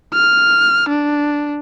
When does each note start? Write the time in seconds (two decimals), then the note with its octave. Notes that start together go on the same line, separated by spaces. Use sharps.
0.14 F6
0.89 D4